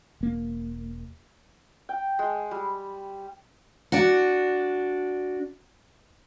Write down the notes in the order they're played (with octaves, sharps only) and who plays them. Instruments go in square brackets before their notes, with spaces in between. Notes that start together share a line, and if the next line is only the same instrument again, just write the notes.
[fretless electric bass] E1 A#3
[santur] G5
G#3
G3
[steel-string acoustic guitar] D4 F#4